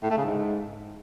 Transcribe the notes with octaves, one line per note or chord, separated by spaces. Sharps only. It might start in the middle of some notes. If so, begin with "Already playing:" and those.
A2
A3
C#3
G#2